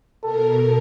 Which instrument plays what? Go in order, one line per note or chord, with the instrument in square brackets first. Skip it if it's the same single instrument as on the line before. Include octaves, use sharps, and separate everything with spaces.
[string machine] B2 A#4 [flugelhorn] A4